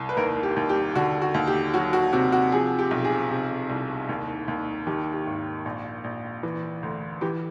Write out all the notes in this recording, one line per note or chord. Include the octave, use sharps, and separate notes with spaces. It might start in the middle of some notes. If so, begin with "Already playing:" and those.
Already playing: C2
B4
D#2 A#4
G4
D#2
G4
D3 F#4
F#4
D#2
G4
F#3 F#4
F#4
C3 F#4
F#4
F3 G#4
G4
B1
G#4
C3
C2
D#2
D#2
D#3 G4
G4
G#1
A#1
A#1
E3
D2
E3 G4